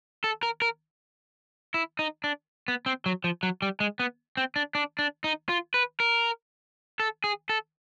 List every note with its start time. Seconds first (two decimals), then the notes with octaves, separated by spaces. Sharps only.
0.24 A4
0.43 A#4
0.62 A#4
1.74 E4
1.99 D#4
2.24 D4
2.68 B3
2.86 C4
3.06 F#3
3.24 F3
3.43 F#3
3.62 G3
3.80 G#3
3.99 B3
4.37 C4
4.56 D4
4.75 D4
4.99 D4
5.24 D#4
5.49 F4
5.74 B4
6.00 A#4
7.00 A4
7.24 G#4
7.49 A4